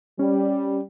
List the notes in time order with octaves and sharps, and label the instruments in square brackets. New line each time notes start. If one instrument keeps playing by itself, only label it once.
[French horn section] G3 [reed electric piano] C#4